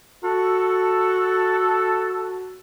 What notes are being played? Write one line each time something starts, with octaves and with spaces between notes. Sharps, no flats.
F#4 A4